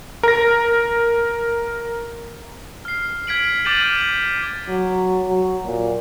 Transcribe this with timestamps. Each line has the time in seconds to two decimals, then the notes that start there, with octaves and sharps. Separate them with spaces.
0.23 A#4 A#6
2.85 F6 C7
3.27 F6 G#6 B6 D7 F#7
3.65 D6 F6 G6 A6 D#7 F#7
4.01 F#7
4.68 F#3
5.28 F#3
5.65 A#2